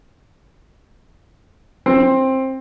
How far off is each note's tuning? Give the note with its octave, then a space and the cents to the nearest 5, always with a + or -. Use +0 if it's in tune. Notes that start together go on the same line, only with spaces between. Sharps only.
C4 +15